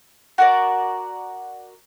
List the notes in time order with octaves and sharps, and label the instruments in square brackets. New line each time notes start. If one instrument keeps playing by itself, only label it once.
[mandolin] F#4 A#4 D5